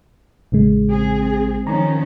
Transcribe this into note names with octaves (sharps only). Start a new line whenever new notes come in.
A1 C#3 G#3
C4 G#4
D#3 F3 C#4 A#5